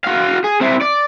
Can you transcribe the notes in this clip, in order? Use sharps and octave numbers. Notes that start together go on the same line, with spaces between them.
F#4 F5
G#4
C4 E4
D5